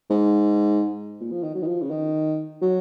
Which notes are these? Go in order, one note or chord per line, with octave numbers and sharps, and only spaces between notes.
G#2
A#2
F3
D#3
F#3
D#3
F3
C#3
D#3
F#3